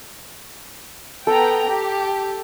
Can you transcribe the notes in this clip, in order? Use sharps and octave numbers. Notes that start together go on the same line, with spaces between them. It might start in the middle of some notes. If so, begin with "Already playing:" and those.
B3 A4 G5 A#5
G4